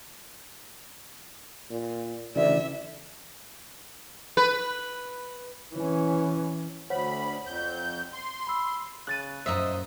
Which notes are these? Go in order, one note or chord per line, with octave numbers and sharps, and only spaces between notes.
A#2
D2 C#3 E3 D5 E5
B4
E3 C#4
D2 C5 C#5 F#5 B5
F2 G6
C6
B5 E6
C#3 F#6 A6 D#7
F#2 A#2 D#4 C5 D#5 E5